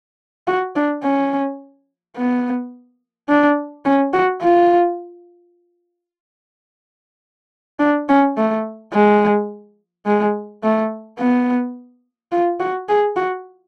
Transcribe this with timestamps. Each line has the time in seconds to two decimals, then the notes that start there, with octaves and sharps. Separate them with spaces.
0.48 F#4
0.76 D4
1.03 C#4
2.17 B3
3.29 D4
3.85 C#4
4.13 F#4
4.43 F4
7.80 D4
8.09 C#4
8.37 A3
8.94 G#3
10.06 G#3
10.63 A3
11.19 B3
12.32 F4
12.60 F#4
12.89 G#4
13.17 F#4